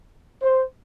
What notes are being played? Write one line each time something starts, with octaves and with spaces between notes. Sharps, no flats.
C5